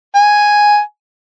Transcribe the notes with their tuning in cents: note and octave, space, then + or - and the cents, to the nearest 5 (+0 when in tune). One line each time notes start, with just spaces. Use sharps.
G#5 +0